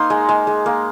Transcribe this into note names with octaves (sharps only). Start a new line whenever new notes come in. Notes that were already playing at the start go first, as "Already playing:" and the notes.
Already playing: A#3 D#4 C6
G#3
G#3
G#3
A#3